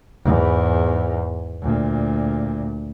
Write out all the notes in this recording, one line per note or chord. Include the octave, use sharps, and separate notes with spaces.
E2 G#2
D2 A#2